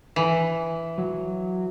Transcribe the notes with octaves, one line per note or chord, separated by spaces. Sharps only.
E3
F#3